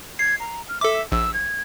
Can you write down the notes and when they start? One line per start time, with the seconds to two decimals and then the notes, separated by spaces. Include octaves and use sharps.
0.19 G#6 C7
0.40 A#5
0.69 F6
0.81 A4 E5 D6
1.12 A#1 E6
1.34 G#6